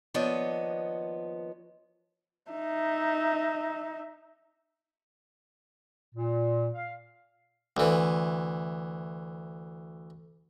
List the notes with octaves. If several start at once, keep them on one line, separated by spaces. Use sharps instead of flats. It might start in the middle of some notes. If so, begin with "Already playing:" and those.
D#2 F3 B3 D4 C#5 D#5
D#4 E5
A#2
F5
D2 E3